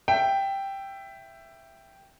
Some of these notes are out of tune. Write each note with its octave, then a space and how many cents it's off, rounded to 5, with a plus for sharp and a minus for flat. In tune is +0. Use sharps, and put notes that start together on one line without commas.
E5 +15 G5 +0